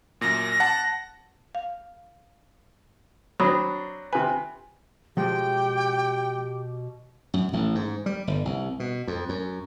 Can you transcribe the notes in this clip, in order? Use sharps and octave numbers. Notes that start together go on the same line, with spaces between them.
F#2 A#2 A#6
F#5 A5
F5
F#3 C4 D4 B5 D#6
C3 B4 G#5
B2 F3 G#3 G4 G5
F#2
A1
G#2
G3
G1
C2
B2
F2
F#2